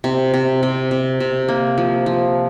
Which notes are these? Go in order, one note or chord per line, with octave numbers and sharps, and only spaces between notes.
C3
C3
C3
C3
C3
A#3
F3
F3